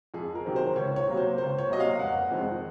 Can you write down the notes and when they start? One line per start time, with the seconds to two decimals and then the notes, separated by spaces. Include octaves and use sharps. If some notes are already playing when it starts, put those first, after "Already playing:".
0.14 F2 G#4
0.35 A#4
0.45 C3 D#3 F#3 C4
0.56 C5
0.76 C#2 C#5
0.96 C#5
1.07 C3 F#3 A#3
1.17 C5
1.38 C#2 C5
1.59 C#5
1.70 C3 F#3 A#3 D#5
1.80 F5
1.99 F1 F#5
2.31 F2 D#3 G#3 C4